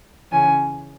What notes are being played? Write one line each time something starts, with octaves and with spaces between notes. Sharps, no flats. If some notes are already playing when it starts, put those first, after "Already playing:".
C#3 E3 C#4 G#5